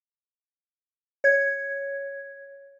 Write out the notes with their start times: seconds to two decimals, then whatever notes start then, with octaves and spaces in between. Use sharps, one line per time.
1.24 C#5 G#6